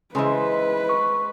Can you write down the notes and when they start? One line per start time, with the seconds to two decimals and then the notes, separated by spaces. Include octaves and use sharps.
0.15 C#3 E3 G#3 B4 C5 D#5
0.89 C#6